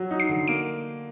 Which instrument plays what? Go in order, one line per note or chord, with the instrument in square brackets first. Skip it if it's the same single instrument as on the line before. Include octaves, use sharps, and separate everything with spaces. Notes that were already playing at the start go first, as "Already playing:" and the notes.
Already playing: [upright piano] F#3
D#4
[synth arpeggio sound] C7
[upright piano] D3
[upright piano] A#3 [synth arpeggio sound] D7